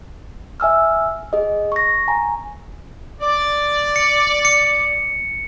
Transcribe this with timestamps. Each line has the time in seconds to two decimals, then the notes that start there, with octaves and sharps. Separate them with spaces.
0.60 E5 G#5 E6 F6
1.33 G#4 D#5
1.72 C#6 A#6
2.08 G#5 A#5
3.21 D5
3.96 C#7
4.45 C#7